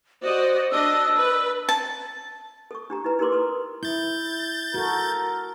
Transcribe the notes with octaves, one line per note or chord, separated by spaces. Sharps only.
F#4 C5 D5 D#5
D4 D#5 E6
B4
A5
A4 C#6
D4 G4 A#5
D#4 E4 B4 A#5
D#4 G4 A#4 B4 C6 D6
A4 B4 D#6
E4 G6 A6
F#4 A4 A#4